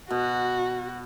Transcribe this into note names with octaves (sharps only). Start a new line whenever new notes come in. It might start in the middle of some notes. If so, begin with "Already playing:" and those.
B2 F#4